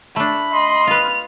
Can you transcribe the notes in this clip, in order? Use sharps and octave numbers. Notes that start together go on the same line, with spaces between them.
A3 D4 B5
D#5 C6
F4 B4 F6